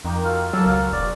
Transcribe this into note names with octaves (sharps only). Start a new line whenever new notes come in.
F2 D#3 A#3 G5
F4 F#4 A4 F5
F#3 A#3 G#4 A4
C#2 F5
E1 D5